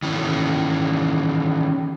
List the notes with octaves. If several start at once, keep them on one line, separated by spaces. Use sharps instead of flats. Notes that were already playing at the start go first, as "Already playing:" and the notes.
D#3 E3 C#4